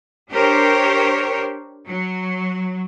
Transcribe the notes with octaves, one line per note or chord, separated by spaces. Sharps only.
D4 G4 A#4 C5 C#5
F#3